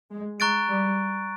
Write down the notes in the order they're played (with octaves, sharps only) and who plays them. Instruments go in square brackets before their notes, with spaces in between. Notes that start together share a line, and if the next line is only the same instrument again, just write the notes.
[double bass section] G#3
[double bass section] G#3 [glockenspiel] A#5 C#6 F#6 A6 D7
[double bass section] G3